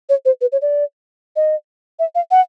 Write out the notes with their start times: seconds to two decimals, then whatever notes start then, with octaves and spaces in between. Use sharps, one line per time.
0.09 C#5
0.25 C5
0.41 B4
0.52 C#5
0.62 D5
1.36 D#5
1.99 E5
2.15 F5
2.31 F#5